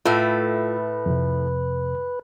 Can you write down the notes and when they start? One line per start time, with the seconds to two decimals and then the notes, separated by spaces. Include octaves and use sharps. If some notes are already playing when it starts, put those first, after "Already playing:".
0.05 A2 A3 F4 B4
1.06 F2 C3